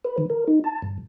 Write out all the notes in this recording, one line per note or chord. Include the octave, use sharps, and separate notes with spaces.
B4
D#3
A#4
D#4
A5
G2